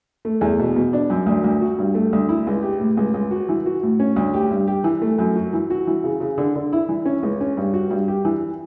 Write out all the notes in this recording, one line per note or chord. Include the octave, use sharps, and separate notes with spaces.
A3
E2
B2
B2
D4
F#2
D2
D2
F#4
G2
A3
D2
E4
C#2
G4
A2
C#2
C#2
F#4
E3
F#4
A2
C#4
D2
G4
G2
G4
E3
A3
F#2
F#4
E3
F#4
E3
C#3
C#3
D3
D3
E4
E3
C#4
C#2
C#4
G2
F#4
G2
G4
E3